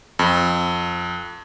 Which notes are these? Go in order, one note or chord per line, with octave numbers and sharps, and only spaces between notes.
F2